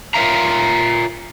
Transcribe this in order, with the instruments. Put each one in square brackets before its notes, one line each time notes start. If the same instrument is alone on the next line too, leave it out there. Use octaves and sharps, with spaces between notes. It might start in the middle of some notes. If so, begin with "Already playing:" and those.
[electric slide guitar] F4 A#4 C#5 E5 F5 A#5